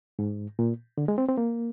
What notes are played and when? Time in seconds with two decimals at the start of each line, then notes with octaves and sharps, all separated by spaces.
0.19 G#2
0.59 A#2
0.98 D3
1.08 G#3
1.18 C4
1.28 C4
1.38 A#3